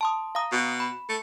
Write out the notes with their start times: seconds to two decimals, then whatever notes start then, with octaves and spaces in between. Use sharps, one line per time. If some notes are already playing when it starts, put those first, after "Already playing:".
0.01 A5 C6 D#6
0.35 F5 A#5 D#6
0.52 B2
0.80 B5
1.09 A3